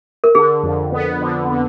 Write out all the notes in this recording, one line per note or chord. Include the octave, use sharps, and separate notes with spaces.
A#4
D3 G#4
F2
B3
D3
D3